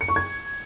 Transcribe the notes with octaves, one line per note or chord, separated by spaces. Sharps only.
C#7
C#6
G#6